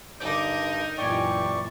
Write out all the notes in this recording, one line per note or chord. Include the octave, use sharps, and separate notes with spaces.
G2 D3 D#4 A#4 D5 G6
F#2 A#2 E3 G4 D5 G5 G#5 C#6